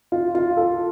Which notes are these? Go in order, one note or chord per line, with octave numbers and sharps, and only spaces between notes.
F4
F4
A4